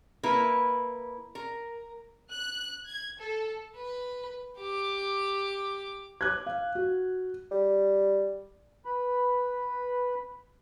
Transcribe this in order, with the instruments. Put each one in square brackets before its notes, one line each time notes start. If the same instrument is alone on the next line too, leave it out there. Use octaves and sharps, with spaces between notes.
[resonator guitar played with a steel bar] A#3 E4 A#4 B4
A#4
[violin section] F#6
G#6
A4
[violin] B4
G4 D6
[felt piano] D6 F#6 G#6
F5
F#4
[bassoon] G3
[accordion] B4 B5